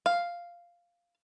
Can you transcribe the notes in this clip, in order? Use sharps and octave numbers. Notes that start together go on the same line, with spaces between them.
F5